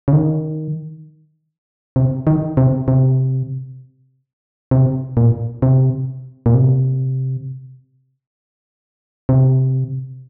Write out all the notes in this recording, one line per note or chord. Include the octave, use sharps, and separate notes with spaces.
C#3
D#3
C3
D#3
C3
C3
C3
A#2
C3
A#2
C3
C3